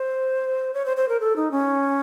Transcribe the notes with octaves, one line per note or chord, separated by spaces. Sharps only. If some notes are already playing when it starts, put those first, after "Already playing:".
Already playing: C5
C#5
C5
C5
A#4
A4
D#4
C#4